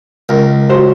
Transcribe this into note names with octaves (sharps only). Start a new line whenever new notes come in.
C#2 A#4
F#3 C5